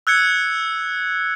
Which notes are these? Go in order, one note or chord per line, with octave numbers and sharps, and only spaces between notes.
E6 F#6 G#6 C#7